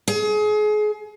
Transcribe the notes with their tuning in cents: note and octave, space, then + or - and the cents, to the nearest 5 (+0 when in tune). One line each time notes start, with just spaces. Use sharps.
G#4 +30